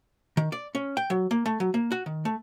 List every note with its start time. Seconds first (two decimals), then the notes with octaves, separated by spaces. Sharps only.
0.37 D#3
0.52 D5
0.75 C#4
0.97 G5
1.10 F#3
1.31 A#3
1.46 A3
1.60 F#3
1.74 A#3
1.92 F#4
2.06 D#3
2.25 A3